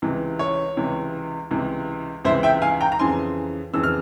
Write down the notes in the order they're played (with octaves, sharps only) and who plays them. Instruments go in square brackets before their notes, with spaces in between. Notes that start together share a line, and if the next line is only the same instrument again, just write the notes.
[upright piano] C#2 C3 E3
C#5
C#2 C3 E3
C#2 C3 E3
C#2 C3 E3 C5 E5
E5 G5
F5 G#5
G5 A#5
A#5
F2 C#3 E3 G#5 C6
F2 C#3 E3 E6
F6